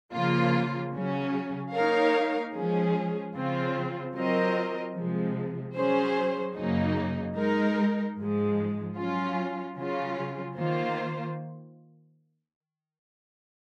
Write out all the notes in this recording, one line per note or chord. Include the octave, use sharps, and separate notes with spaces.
C#3 F3 A#3 F4
C#3 F#3 C#4
A#3 D#4 A#4 C#5 F5
F3 G#3 C#4 G#4
C#3 F3 C4 F4
F#3 C4 F4 A#4 D#5
C3 F3 G#3
F#3 C#4 G#4 C5
F#2 C#3 F#3 A#3 D#4
G#3 D#4 A#4
G#2 F3 G#3
F#3 C#4 F4
C#3 F#3 C#4 F4
D#3 A#3 F4 C5